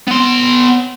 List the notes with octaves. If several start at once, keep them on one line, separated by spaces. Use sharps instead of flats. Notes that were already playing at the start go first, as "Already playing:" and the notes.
B3 C6